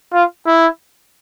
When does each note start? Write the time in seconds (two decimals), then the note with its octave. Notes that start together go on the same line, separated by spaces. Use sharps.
0.13 F4
0.47 E4